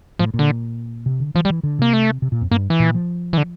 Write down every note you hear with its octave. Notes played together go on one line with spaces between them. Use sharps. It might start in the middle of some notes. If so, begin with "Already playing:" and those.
A2 F3
A#2
D3
C3
D3
E3 F3
G3
E3
D3
C3 A#3
A3
C3
A#2
F2
G2 A#3
E3
A#2
F3
E3
D3